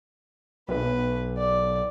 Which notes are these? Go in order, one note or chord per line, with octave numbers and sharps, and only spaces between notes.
B1 B4
D5